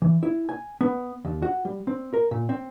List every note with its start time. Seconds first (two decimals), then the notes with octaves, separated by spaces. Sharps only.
0.02 E3
0.23 E4
0.49 G#5
0.81 B3
1.25 D#2
1.42 F#4
1.65 G3
1.87 C4
2.14 A#4
2.31 A#2
2.49 C4